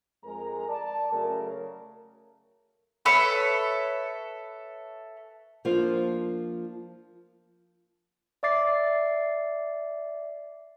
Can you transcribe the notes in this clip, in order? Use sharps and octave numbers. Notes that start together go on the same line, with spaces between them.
F2 G#3 A#4 G#5 A#5
D5 A5
C#3 F#3 A3 C#4 A#4
A4 B4 C#5 E5
F3 A#3 D4 F4
D5 E5 D6 A6 C7